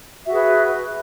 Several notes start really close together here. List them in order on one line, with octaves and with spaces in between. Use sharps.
E5 F#4 G#4 B4